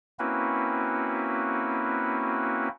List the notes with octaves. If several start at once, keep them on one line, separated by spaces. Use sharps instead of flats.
A#3 C4 C#4 E4 F#4 B4